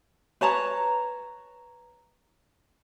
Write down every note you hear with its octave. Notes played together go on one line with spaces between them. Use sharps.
B4 C#5 A5 A#5